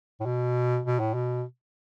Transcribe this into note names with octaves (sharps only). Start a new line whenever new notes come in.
A2
B2
B2
A2
B2